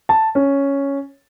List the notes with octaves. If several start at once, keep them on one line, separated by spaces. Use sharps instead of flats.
A5
C#4